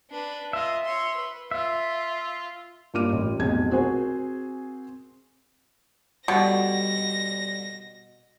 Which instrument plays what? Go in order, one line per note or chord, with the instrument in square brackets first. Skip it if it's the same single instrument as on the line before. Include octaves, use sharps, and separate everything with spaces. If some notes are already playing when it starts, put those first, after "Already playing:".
[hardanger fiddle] D4 B4
[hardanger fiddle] F4 D#5 [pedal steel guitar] E5
[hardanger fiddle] C#5 C6
B4
[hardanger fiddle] F4 [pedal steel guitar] E5
[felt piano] G2 A#3 F4 D6 F6 D#7
A1
F1 B1 F2 G#4 G#6
C4 F#4 G#4 A#4 C5 G#5
[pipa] B2 [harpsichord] D3 G3 [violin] A#6